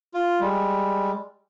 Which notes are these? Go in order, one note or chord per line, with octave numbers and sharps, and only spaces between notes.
F4
G3 G#3